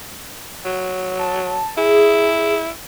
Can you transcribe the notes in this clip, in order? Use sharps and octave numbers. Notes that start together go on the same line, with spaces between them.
F#3
A5
E4 G#4